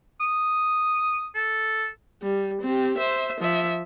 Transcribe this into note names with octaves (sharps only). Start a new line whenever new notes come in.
D#6
A4
G3
C4 G4
C5 E5
F3 E5